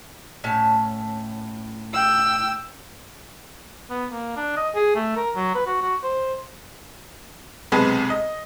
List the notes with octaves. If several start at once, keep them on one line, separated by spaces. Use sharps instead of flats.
A2 C#4 A5
G5 E6
B3
A#3
D4
D#5
G#4
A3
A#4
F#3
B4
F#4
F#4
C5
B1 C3 G#3 G#4 B4 A5
D#5